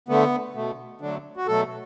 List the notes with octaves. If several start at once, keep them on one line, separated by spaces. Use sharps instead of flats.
D3 A3 B3
B2 A3
D3 F#3 A3 D4
F#4
B2 F#3 A3 A4